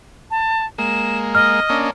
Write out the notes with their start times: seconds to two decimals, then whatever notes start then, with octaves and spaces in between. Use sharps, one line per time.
0.31 A5
0.78 G#3 A#3 E7
1.35 D#5 F6
1.69 A#3 C#4 D4